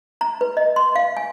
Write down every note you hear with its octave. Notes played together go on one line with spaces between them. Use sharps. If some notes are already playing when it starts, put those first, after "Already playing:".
A#5
B4
D#5
C6
F5
G#5